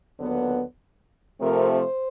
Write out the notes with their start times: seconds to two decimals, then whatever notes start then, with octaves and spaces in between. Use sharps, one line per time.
0.18 D#2 D3 F#3 B3
1.40 C3 F3 A3 C4 A#4
1.70 C5